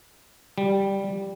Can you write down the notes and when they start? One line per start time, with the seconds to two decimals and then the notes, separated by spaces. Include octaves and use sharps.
0.58 G3